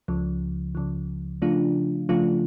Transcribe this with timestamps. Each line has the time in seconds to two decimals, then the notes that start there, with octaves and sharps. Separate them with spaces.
0.08 C#2 C#3 F3
0.75 C#2 C#3 F3
1.42 C#3 F3 A3 D4 F4
2.09 C#3 F3 A3 D4 F4